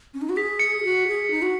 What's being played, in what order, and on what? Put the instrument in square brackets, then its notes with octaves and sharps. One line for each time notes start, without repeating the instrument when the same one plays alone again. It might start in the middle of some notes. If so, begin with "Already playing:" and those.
[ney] C#4
D#4
F#4
[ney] G#4 [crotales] B6
[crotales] C#7
[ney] G#4
F#4
G#4
D#4
F#4